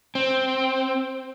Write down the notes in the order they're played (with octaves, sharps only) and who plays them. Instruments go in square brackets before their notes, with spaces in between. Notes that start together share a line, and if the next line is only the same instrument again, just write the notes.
[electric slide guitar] C4